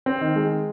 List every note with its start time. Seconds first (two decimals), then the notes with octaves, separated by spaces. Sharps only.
0.06 C4
0.21 D#3
0.36 G#3